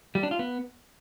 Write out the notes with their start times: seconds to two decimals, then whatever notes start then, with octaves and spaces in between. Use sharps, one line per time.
0.15 G3
0.23 D4
0.31 F4
0.39 B3